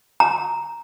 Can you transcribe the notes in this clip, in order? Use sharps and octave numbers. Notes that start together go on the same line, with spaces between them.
A#5